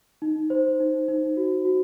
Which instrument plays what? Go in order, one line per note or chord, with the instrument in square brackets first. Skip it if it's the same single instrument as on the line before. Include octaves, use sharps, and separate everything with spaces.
[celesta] D#4
C5
D#4
D#4
F#4
F#4